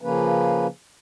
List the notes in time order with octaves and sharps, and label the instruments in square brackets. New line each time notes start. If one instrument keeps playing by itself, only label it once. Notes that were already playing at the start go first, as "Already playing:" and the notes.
[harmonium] C#3 F3 A#3 C#4 B4